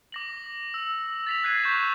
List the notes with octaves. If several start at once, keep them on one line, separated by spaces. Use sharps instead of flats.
D6 A#6 F#7
E6
A6 B6 F7
F#6 G#6 B6 C7 D#7
C#6 G6 B6 E7